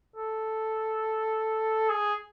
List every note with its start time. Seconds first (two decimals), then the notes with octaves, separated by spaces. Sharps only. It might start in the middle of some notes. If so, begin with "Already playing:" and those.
0.16 A4
1.90 G#4